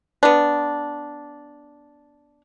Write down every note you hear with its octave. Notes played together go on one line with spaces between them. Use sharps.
B3 D4